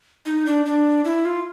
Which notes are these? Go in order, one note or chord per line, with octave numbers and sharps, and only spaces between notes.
D#4
D4
D4
E4
F4